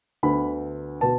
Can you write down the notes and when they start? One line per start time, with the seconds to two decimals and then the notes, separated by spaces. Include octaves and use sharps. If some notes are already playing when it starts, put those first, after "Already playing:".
0.23 D2 D3 B3 B5
1.01 B2 B3 A5